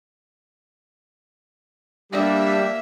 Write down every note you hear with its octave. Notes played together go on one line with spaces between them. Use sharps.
G3 A#3 D4 E5